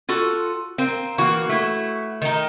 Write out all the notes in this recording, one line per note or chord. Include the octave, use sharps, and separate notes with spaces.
F4 F#4 A4
A#3 C4
E3 A#3 F#4
A3 E4
D#3 D#4